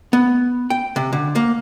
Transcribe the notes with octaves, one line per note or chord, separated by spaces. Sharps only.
B3
G5
C3
D3
A#3